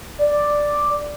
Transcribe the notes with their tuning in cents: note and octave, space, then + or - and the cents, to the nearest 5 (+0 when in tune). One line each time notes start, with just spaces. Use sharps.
D5 +0